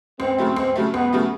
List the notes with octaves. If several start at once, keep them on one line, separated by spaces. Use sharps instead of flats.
C#2 C4
C#3 F#3 A3
C#2
C#3 F#3 A3
C#2 B3
C#3 F#3 A3